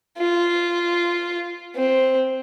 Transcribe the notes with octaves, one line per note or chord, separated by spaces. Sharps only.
F4
C4